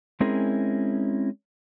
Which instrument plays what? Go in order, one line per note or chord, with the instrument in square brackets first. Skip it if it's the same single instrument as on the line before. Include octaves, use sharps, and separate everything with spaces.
[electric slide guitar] G#3 C4 C#4 E4 G#4 A#4